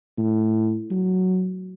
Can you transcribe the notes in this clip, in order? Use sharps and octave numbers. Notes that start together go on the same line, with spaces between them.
A2
F#3